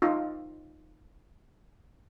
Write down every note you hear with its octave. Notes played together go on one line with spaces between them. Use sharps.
D#4 F4